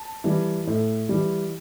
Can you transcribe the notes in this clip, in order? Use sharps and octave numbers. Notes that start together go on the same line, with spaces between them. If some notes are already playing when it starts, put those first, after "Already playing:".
Already playing: A5
E3 G3
A2
E3 G3